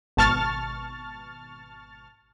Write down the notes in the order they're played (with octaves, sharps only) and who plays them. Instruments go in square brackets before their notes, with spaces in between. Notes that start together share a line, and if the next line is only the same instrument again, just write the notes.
[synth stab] G#1 B2 A5 C#6 F6 A6